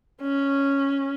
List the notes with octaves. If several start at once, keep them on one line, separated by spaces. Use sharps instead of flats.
C#4